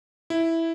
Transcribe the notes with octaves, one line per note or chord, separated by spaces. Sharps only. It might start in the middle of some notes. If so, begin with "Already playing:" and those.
E4